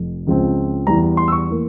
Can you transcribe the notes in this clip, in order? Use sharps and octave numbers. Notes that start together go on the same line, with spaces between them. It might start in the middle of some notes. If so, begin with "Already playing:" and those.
Already playing: F1 F2
C#2 C#3 F3 C4
E2 E3 G3 A#5
C6
E6
C#6
E3 A#3